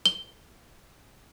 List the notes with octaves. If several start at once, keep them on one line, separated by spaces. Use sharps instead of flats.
G7